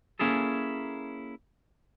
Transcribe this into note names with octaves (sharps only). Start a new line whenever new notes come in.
A#3 C#4 E4 G#4 A4